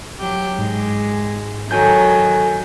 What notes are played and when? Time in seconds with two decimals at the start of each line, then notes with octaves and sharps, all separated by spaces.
0.19 F#3 G4
0.58 G#2 G#3
1.71 D#3 F#3 A4 G#5 G6